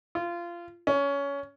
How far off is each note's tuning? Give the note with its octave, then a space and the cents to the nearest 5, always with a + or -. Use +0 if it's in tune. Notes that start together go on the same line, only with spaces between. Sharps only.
F4 -20
C#4 +20